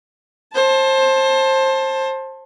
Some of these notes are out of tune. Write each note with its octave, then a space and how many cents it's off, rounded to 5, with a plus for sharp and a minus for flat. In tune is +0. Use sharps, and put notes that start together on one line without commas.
C5 +25 A5 +0